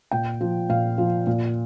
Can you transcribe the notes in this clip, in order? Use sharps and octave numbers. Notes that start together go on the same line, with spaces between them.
A#2 G5
F3
A#2 F5
F3
A#2